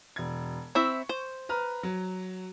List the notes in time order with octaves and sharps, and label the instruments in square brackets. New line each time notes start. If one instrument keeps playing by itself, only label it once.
[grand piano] E1 G#6
[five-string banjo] C4 E4 E5 [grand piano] C#6
[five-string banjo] C5
[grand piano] B4 A#5 F6
F#3